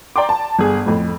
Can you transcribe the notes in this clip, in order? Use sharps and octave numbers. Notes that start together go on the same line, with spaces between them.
D5 G5 A#5 C6 D6
A5
G1 G#4
F2 A2